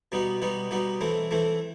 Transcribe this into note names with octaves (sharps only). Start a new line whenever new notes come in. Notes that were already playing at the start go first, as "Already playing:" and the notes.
B2 G3 B3 D#4 F#4
B2 G3 B3 D#4 F#4
B2 G3 B3 D#4 F#4
E3 A3 C4 E4
E3 A3 C4 E4